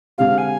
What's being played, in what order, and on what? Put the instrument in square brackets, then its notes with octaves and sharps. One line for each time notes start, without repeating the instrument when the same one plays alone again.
[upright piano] D3 G#3 C4 G4 [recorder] F5
[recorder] G#5